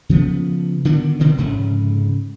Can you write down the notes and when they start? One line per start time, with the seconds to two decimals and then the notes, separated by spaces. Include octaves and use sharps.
0.09 C#3 F3 A3 B3
0.85 D3 D#3 B3 D4
1.20 B2 D3 D#3 C4
1.37 F1 G#2 C#3 A3